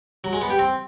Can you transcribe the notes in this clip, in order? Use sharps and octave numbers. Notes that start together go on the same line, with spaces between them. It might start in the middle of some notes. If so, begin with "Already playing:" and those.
F#3
G#3
B3
G4
C4